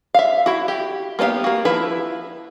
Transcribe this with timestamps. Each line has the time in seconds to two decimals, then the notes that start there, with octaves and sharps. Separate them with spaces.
0.14 E5 F5
0.46 E4 F#4
0.68 G4
1.19 A#3 B3 D4 G4 F5
1.44 A#3 F#4
1.65 F3 E4 B4